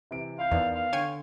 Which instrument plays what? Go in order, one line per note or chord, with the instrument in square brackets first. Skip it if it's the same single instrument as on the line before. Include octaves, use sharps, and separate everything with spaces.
[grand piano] C3 E3 D7
[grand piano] E4 G6 [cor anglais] F5
[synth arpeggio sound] E2 [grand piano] D#3 B3 D5
[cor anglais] F5
[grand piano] D3 [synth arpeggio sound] C#5 G5 G#5